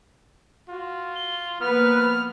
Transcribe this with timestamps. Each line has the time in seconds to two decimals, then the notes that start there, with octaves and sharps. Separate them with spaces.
0.69 F4 F#4
1.15 G7
1.61 F3 A#3 B3 B4 F6